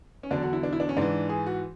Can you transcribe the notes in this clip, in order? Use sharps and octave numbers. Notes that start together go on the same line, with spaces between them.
C#4
E2 D3 F#3 D4
F#4
E4
D4
E4
D4
C#4
G#2 E3 D4
G#4
F#4